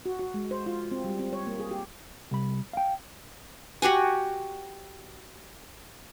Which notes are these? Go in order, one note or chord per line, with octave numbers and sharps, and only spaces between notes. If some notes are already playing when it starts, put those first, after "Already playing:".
F#4
F#4
G#3
C5
F4
C4
G3
C4
C#5
A#3
G#4
G4
C2 B5
F5 G5
F#4 G4 F#5 G#5